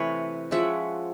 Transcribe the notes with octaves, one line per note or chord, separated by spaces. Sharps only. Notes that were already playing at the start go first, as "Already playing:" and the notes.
Already playing: C3 E3 A3 B4 C#5
F3 G#3 C#4 E5 F#5